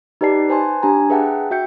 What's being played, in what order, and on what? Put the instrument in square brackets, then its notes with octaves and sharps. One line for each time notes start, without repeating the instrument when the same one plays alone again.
[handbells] D#4 G4 B4 D5 A5 C7
B4 C5 G#5 A5 C6
D4 G4 G#5 A#5
G#4 B4 E5 F#5 G5 A5
F#4 E5 G5 G6 C#7